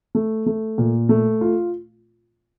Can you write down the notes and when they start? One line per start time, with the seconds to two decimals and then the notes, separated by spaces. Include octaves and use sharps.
0.15 A3
0.46 A3
0.78 A#2
1.09 A3
1.41 F4